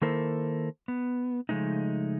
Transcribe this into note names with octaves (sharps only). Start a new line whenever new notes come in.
D#3 A#3 E4 A4 A#4 C5
B3
C#3 F3 G#3 A3 D#4